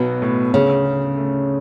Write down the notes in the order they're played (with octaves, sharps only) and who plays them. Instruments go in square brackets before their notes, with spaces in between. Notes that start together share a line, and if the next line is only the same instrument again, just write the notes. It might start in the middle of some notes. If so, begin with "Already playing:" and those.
Already playing: [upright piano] B1 F#3 B3 [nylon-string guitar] B2
[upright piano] A2
[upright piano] D2 [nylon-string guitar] C#3
[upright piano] C#4
A3